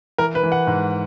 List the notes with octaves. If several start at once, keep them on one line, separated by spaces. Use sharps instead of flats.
E3 A#4
B4
E3
F#5
G#2